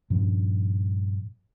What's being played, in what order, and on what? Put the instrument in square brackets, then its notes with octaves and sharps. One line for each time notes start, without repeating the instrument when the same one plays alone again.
[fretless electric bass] G2 A#2 F3 C#4